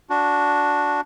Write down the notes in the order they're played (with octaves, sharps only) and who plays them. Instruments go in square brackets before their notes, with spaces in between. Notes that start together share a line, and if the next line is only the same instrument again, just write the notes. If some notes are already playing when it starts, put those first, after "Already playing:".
[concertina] D4 F#4